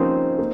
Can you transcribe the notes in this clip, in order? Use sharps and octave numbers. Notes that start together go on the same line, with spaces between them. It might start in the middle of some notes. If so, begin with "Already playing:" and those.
Already playing: F3 A#3 C4 C#4 D#4 G4
A#3